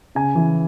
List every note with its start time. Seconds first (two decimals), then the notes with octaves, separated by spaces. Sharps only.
0.15 C#3 G#5
0.35 E3